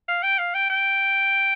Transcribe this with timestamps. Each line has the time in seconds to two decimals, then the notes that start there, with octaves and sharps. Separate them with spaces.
0.08 F5
0.23 G5
0.39 F5
0.55 G5
0.70 G5